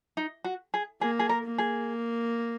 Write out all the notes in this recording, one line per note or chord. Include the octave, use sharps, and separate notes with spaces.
D#4
F#4
G#4
A#3 G#4
G#4
A#4
A#3
G#4